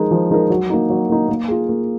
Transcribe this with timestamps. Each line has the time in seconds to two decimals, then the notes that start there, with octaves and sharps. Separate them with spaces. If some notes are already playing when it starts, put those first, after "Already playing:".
Already playing: F3 G#3 D#4 A#4
0.11 F3
0.31 G#3 D#4 A#4
0.50 F#3
0.70 A#3 D#4
0.90 F#3
1.09 A#3 D#4
1.29 A#3
1.48 F4 G#4
1.69 A#3